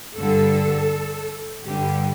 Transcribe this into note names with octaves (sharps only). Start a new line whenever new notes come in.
G2 D3 G3 A4
G2 D3 G3 G4